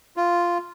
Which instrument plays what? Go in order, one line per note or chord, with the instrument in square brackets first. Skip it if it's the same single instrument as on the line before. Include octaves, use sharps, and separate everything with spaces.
[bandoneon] F4